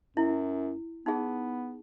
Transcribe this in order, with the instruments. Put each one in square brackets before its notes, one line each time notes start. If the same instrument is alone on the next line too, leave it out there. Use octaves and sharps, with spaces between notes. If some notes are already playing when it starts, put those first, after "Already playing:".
[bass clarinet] F#2 [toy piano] E4
[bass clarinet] B3 [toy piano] D#4 G#4